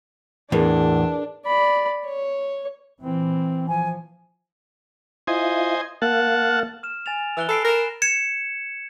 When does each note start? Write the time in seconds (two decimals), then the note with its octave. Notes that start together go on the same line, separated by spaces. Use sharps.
0.52 E2 A2 D4 G#4 A#4 B4
1.46 D5 B5
2.06 C#5
3.01 A#2 E3 C4
3.69 F3 G#5
5.27 E4 F4 C5 D#5 G#5
6.02 A#3 F5 F#5 A5
6.83 F6 E7
7.06 G#5 A6 F7
7.37 E3 E6 F#6 G7
7.48 A4 B5 C7 D7
7.64 A#4 A#6 E7
8.02 G#6 C#7 E7